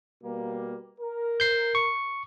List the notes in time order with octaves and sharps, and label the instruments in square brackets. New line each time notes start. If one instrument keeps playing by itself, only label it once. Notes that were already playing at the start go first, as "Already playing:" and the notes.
[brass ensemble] B2 G3 A#3
A#4
[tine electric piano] G6 C7
C#6